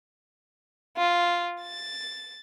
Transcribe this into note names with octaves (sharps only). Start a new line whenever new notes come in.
F4
A6